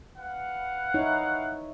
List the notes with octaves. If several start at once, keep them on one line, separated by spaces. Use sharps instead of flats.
B4 F5 F#5
D#4 E4 C#5